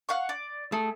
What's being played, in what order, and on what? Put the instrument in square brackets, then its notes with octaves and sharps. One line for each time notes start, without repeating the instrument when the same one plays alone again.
[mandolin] F5 F#5 C#6
D5
[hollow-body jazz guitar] A3 A4 [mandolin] G#4